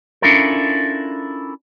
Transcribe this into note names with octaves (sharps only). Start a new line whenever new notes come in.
C#4 D4 E4 F4 A4 A#4